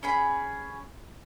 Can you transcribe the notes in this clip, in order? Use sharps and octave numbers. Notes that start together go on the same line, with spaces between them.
C#4 G#4 B5